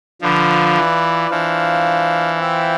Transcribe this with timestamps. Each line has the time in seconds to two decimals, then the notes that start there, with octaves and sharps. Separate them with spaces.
0.21 D3 F3 F4 B4 D5
0.76 E3
1.30 E3 D4 F4 C5 F5
2.39 C4 F4 C5 E5 G5